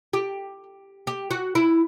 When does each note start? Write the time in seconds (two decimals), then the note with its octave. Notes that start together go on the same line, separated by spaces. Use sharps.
0.13 G4
1.07 G4
1.31 F#4
1.55 E4